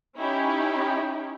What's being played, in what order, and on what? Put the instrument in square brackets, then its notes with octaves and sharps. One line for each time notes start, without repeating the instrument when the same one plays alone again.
[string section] C#4 D#4 E4 G4